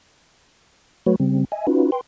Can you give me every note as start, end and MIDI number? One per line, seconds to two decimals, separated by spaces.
1.06 1.16 54
1.06 1.16 57
1.06 1.16 66
1.06 1.16 71
1.06 1.16 73
1.20 1.45 49
1.20 1.45 55
1.20 1.45 60
1.52 1.66 75
1.52 1.66 76
1.52 1.66 80
1.67 1.91 61
1.67 1.91 63
1.67 1.91 65
1.67 1.91 66
1.67 1.91 71
1.92 2.01 71
1.92 2.01 79
1.92 2.01 84